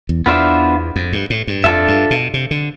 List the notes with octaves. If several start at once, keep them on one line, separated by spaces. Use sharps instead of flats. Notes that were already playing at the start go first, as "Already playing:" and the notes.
E2
E2 B3 D4 F4 C5 E5
F2
G2
A2
G2
F2 D4 F4 A4 E5
G2
B2
C3
D3